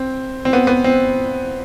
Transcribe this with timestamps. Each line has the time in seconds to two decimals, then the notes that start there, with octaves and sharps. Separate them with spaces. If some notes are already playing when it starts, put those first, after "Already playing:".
Already playing: C4
0.45 C4
0.53 B3
0.67 B3
0.84 C4